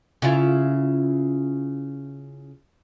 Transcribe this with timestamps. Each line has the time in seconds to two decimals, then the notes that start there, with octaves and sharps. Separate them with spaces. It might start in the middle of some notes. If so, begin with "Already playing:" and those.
0.22 C#3 E4 F4